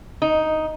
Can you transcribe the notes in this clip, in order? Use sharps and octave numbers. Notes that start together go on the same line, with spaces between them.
D#4